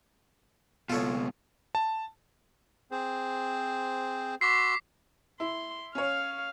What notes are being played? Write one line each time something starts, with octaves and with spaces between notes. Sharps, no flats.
C#2 B2 F4 A4 C#5
A5
C4 G#4 C5
F#4 C6 D6 E6 B6 C7
E4 C6
C#4 C#5 F5